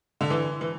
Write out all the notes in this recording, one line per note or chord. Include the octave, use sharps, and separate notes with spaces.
D3
E3
E3